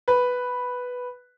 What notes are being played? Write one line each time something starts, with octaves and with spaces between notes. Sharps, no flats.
B4